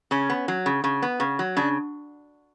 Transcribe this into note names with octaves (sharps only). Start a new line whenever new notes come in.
C#3 C#4
B3
F#3
C#3
C#3
B3
C#3
F#3
C#3 D4